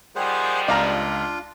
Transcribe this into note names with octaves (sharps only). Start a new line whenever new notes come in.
D#3 F3 G3 G#4 C5 F#5
C#2 D4 F4 D5 F5 A#5